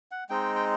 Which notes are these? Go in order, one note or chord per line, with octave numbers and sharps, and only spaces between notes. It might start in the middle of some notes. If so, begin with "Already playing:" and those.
F#5
G#3 C4 D#4 G5
G5